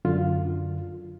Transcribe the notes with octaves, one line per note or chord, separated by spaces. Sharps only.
F#2 D3 F4